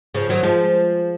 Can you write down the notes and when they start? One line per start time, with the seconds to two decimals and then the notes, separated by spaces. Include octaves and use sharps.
0.14 C#3 F3
0.29 D#3 F#3
0.43 F3 G#3